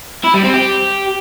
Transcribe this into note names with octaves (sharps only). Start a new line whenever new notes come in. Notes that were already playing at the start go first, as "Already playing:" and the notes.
E4
G3
C4
G4